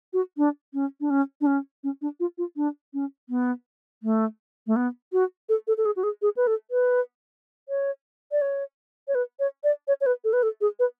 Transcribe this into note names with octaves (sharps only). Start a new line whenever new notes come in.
F#4
D4
C#4
D4
C#4
D4
C#4
C#4
D4
F4
F4
D4
C#4
B3
A3
A3
B3
F#4
A4
A4
A4
G#4
F#4
G#4
G#4
B4
A4
B4
C#5
D5
C#5
C#5
B4
C#5
D5
C#5
C#5
B4
A4
B4
A4
G#4
B4